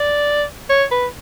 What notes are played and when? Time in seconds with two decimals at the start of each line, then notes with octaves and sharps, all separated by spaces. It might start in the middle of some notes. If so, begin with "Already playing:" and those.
Already playing: D5
0.70 C#5
0.91 B4